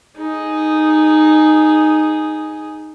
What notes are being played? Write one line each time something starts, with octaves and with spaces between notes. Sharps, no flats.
D#4 G#4